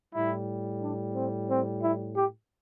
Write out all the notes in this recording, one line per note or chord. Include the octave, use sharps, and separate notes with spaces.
A2 G3 E4
D4
C4
C4
E4
G4